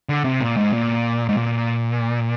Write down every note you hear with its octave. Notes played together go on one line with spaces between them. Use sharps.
D3
C3
A#2
G#2
A#2
G#2
A#2